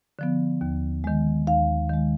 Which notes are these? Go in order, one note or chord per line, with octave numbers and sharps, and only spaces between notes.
D3 F3 B3
D#2
D#3 G#3
D#2 F5
D#3 G#3